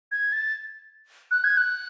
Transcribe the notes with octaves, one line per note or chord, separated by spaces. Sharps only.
G#6
A6
F#6
G#6
F#6